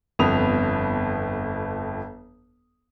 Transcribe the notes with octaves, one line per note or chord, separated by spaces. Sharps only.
G1 F2 B3 B5 D#6 F7